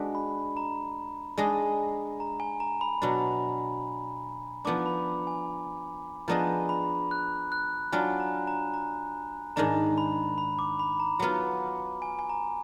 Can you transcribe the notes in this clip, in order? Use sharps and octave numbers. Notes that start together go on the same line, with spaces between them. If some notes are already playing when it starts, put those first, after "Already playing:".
Already playing: G#3 D4 F#4 B4
B5
A#5
G#3 D4 G#4 D#5
A#5
G#5
A#5
B5
B2 F#3 D4
F3 B3 D4 D6
B5
G#5
F3 B3 D4 G#4 D#5 A#5
B5
F#6
F#6
F#3 D4 F4 G#5
A#5
A#5
A#5
G#2 D#3 G#3 D4 A#5
B5
B5
D6
B5
A#5
F#3 B3 F4
G#5
G#5
A#5